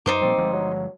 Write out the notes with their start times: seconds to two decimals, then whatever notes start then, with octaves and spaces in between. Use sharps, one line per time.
0.06 F#2 D#4 C5 D6
0.21 A#2 F3 G3 C4
0.38 G1 F3 G#3
0.53 F#3